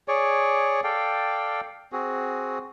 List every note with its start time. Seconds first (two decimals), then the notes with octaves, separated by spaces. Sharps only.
0.08 G#4 C#5 D5
0.84 A4 D5 F5 G5
1.92 C4 F#4 G#4